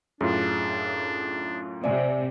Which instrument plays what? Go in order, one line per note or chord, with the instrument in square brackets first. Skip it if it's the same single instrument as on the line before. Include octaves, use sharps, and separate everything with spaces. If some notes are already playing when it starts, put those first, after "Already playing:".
[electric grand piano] F#2 A2 F4 [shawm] D4 [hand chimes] G#4
[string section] C3 [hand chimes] D5 E5 G#5